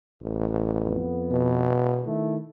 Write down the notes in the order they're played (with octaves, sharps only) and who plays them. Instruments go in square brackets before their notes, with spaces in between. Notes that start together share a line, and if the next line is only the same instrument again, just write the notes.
[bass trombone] A1
[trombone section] F2 B3
[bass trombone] B2
[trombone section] D#3 A3 E4